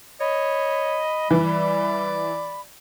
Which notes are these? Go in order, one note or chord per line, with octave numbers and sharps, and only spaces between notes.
C#5 D#5 B5
E3 G3 D5